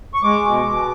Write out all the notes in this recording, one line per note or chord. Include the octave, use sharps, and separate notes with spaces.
C#6
G#3 D6
B2
B2